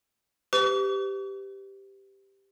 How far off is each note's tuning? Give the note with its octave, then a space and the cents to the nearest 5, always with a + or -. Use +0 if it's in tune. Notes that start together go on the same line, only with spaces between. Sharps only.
G4 +0 B4 +45 C#6 +45